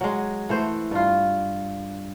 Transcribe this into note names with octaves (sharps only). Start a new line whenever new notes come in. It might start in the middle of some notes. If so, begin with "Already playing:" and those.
F#3 G#3
E3 A3 C5
G2 F4